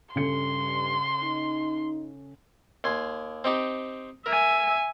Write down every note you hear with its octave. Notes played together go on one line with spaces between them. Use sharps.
G2 C#3 A4 C6 C#7
D#4
D#2 G#5 C6
C4 D#4 G4
A#4 E5 G#5